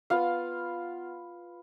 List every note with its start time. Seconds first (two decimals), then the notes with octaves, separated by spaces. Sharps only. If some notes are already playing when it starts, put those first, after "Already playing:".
0.10 B3 F4 F5